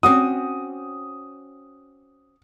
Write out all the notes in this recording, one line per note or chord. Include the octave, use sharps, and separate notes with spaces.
C4 C#4 F#4 D#6